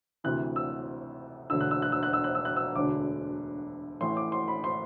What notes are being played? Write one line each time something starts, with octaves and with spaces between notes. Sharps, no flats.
D2 C3 E3 F#6
E6
E1 D2 D3 E6
F#6
E6
F#6
E6
F#6
E6
F#6
E6
F#6
E6
E1 D2 D3 D6
A1 A2 E3 C6
D6
C6
B5
C6